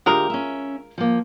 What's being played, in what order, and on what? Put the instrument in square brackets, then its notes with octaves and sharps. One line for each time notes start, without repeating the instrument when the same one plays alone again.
[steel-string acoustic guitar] D2 G4 [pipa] G#3 F4 A#4
[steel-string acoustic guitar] C#4 E5
F3 A#3